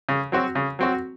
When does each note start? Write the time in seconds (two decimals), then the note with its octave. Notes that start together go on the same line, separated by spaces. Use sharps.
0.09 C#3
0.32 F#3 C4 F#4
0.55 C#3
0.79 F#3 C4 F#4